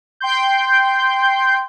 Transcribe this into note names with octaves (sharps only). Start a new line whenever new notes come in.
G5 C6 G6